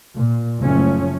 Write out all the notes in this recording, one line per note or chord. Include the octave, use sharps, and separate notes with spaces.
A#2
F#1 F3 A3 C#4